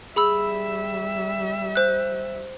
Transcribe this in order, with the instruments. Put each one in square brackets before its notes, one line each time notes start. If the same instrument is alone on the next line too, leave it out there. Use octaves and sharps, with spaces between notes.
[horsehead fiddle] G3 E5 [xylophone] G#4 B5 E6
[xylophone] C5 F#6